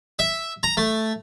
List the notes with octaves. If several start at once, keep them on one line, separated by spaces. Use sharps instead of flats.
E5
A#5
A3